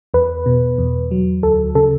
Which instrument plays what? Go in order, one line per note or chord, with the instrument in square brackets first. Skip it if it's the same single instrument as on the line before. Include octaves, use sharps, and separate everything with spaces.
[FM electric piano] E2 B4
B2
E2
F#3
D2 A4
C#3 A4